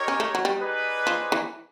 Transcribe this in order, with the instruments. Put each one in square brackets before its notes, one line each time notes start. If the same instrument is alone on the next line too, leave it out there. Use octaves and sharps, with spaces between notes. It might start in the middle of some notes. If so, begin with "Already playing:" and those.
Already playing: [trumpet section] D#4 G4 A#4 C#5
[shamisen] C#4
A3
F#3
G3
[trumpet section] D#4 G#4 B4 D5
[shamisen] F3
E3